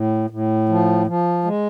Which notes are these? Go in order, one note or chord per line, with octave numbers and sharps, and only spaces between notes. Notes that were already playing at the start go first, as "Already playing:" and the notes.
Already playing: A2
A2
F3
F3
G#3